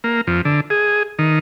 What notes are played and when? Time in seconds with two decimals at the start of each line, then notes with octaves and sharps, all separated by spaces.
0.04 A#3
0.27 F2
0.45 D3
0.70 G#4
1.19 D#3